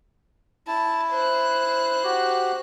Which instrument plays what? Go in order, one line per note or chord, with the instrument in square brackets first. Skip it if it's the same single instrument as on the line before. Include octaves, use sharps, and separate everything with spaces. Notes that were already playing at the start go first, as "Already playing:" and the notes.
[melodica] E4 [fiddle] A5
[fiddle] C5 F#6
[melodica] F#4 G4